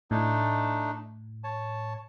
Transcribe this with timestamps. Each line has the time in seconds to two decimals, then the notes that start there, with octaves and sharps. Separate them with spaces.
0.11 A2 A3 D4 D#4
1.44 C#5 A5